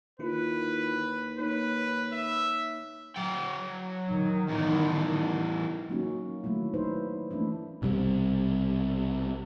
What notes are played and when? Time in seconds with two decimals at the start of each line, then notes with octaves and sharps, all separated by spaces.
0.19 D#2 D#3 E4 F4 B4
1.39 A#3 D#4 B4 C#5
2.13 E5
3.16 F#3 G5
4.10 D#3
4.48 E2 A2
5.89 F#3 A#3 C#4 D#4 F#4
6.44 D#3 F#3 A3 A#3 E4
6.74 D#4 E4 B4 C5
7.31 E3 A3 A#3 C#4 D4 E4
7.82 B1 C3 D#3 G3